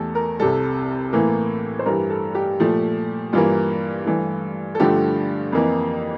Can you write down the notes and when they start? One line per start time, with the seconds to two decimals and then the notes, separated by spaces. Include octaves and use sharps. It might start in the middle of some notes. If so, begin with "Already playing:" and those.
Already playing: E2 E3 A3 G4 A4
0.15 A#4
0.40 C2 C3 G3 A4
1.13 A2 E3 A#3
1.79 C5
1.86 G2 E3 G3 A#4
2.10 A4
2.35 G4
2.60 A#2 F3 A3
3.33 G2 E3 A#3 F4
4.06 G2 E3 A3
4.75 A4
4.80 G2 D3 F3 A3 G4
5.52 F2 E3 A#3